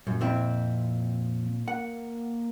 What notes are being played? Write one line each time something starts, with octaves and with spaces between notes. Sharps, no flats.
F#2 A#2
F2 C4 E4
A#3 F#5